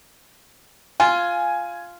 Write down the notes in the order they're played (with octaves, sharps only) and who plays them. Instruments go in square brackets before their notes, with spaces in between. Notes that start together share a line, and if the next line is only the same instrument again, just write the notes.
[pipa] F4 [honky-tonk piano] G#5